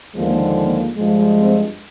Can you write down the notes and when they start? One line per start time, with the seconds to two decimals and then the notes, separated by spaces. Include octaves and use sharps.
0.15 D#2 D3 F3 G#3 A#3
0.57 A#3
0.97 G2 F3 G#3
1.38 C4